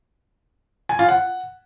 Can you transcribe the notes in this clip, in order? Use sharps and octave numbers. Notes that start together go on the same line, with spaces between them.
G#5
F4
F#5